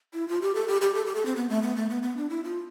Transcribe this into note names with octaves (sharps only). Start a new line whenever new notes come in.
E4
F4
G4
A4
G4
G4
A4
G4
A4
C4
B3
A3
B3
A3
B3
B3
D4
E4
F4